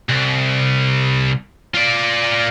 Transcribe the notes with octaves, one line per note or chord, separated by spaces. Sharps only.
C2
F4 D5